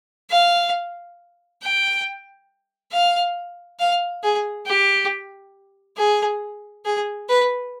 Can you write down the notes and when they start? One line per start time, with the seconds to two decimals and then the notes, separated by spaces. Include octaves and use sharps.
0.30 F5
1.62 G5
2.92 F5
3.79 F5
4.24 G#4
4.66 G4
5.97 G#4
6.85 G#4
7.29 B4